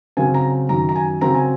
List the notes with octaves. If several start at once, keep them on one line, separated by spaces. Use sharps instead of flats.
C#3 F#3 C4 G#5
A#5
F#2 D#3 F#3 A#5
A#5
G#5
C#3 F#3 C4 A#5
G#5